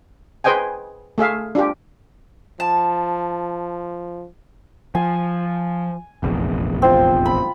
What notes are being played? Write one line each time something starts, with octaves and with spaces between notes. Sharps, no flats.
G#4 B4 C5 D#5 G5 G#5
A3 G#4 E5 F5
D4 F4 G4
F3 A5
F3 G#5
F1 A#1 E2
C4 F4
B5